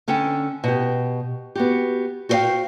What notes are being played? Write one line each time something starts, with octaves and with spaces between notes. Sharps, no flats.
D3 C#4 A4 G5
B2 G4
B3 F#4 G4
F#4 G4 C5 C#5 F5 G5